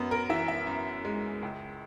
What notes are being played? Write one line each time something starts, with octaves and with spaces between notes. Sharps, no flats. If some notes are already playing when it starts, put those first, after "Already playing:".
Already playing: F#2 B3
A#4
E3 E5
E5
F#2
G#3
C#2